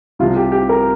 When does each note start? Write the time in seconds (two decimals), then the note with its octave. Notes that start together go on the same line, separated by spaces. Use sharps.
0.19 C2 C3 F3 F4
0.36 G4
0.52 G4
0.69 A#4